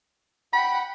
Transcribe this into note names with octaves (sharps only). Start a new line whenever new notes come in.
F#5 G5 B5